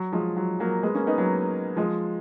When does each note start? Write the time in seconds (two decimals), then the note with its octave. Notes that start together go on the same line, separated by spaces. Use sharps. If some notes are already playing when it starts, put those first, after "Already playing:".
Already playing: F#3
0.13 F3 G#3
0.37 F#3
0.60 F#3 A#3
0.83 G#3 B3
0.95 A#3 C#4
1.07 B3 D#4
1.18 F#3 A#3
1.76 F3 G#3